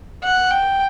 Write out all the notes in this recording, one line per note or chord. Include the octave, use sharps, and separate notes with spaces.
F#5
G5